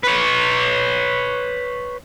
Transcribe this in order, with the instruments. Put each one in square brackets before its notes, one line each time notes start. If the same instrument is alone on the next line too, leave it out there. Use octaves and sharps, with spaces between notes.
[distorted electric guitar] B4 C#5